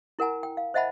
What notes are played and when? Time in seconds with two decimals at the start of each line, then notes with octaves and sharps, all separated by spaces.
0.19 E4 A#4 F#5 G#5 A#5
0.43 G5
0.57 F5
0.74 C5 D#5 E5 F#5 A5 B5